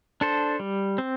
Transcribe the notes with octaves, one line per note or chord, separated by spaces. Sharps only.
D4 A4 C5
G3
C4